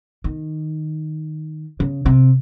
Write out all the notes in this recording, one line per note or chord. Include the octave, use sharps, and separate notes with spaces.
D#3
C#3
C3